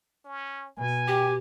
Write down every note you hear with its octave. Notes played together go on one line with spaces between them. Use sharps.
C#4
B2 G#5
G4 G5